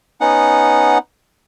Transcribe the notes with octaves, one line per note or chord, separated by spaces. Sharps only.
B3 C#4 D#4 F#5